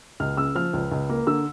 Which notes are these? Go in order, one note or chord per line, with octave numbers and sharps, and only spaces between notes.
C#2 F6
C#3 E6
F3 F6
C#2
C#2
A#3
D3 E6